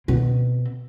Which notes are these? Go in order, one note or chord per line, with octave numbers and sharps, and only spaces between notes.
B2 C4